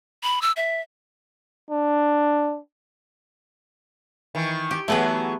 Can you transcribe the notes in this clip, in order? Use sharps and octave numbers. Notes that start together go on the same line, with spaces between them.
B5
E6
E5
D4
D#3 E3
G4
E3 F#3 A3 B3 G#4 B4